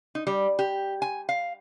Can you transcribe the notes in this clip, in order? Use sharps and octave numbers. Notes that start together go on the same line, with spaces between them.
D#4
G3
G4
G#5
F5